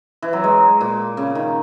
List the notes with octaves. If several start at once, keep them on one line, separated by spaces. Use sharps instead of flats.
E3
F#3
G#3
A#2
C#3
D#3